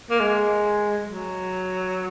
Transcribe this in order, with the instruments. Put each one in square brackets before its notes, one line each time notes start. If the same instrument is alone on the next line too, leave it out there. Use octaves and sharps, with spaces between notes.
[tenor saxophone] A#3
G#3
F#3